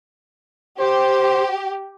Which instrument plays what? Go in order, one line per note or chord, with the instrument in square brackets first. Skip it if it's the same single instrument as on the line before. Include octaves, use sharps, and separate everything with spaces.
[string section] G4 [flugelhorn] C5